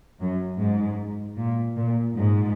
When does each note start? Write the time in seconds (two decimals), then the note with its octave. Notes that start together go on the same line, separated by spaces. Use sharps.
0.20 F#2
0.60 G#2
1.37 A#2
1.76 A#2
2.16 G#2